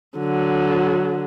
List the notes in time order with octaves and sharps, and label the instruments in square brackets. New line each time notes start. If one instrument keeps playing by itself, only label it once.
[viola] D3 F#3